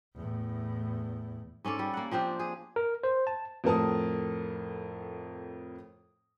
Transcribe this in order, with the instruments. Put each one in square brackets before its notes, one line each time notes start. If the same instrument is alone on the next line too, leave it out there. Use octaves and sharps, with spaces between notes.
[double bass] E2 A2
[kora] G#2 C#4 A4 D5
G3
A#3 F#5
F3 C4 D4 G4
G#4
[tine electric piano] A#4
C5
A5
[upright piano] F2 A2 A4 A#4 A5 D#6